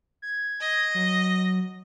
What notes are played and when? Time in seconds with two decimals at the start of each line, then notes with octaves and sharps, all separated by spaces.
0.22 G#6
0.61 D#5
0.95 F#3